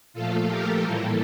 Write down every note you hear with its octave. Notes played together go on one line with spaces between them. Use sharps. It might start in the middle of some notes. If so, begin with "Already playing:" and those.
A#2 F3 A3 F4 A4
G4 A#4
A2 E3 G3 A#3 F4 A4